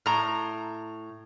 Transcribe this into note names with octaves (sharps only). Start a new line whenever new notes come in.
A2 A#5